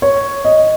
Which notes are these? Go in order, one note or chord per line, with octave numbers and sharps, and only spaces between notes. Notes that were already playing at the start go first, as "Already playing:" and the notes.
C#5
D#5